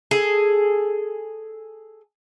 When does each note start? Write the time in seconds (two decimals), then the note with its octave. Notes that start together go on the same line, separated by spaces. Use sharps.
0.11 G#4 A4